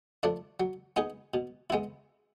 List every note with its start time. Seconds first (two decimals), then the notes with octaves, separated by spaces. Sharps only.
0.23 F3 A3 D4
0.60 F#3
0.96 B3 D#4 G#4
1.34 B2
1.70 G#3 B3 E4